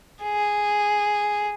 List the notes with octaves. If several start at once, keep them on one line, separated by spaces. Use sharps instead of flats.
G#4